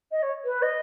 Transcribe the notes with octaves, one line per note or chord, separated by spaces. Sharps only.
D#5
C#5
B4
D#5